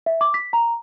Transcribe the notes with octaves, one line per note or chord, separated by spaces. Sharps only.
E5
D6
B6
A#5